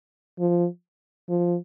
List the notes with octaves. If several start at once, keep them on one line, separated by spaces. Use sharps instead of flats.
F3
F3